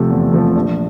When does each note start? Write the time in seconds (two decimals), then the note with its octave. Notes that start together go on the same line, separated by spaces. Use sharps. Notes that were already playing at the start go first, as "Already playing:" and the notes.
Already playing: C3 F3 A3
0.10 E2
0.32 C3 F3 A3
0.55 A#1